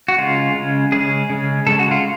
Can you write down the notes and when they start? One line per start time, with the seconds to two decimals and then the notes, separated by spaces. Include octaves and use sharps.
0.08 F#4
0.18 C#3 G#3 C#4 F4
0.55 C#3 G#3 C#4
0.92 C#3 G#3 C#4 G#4
1.30 C#3 G#3 C#4
1.66 C#3 G#3 C#4 A4
1.79 F#4
1.91 F4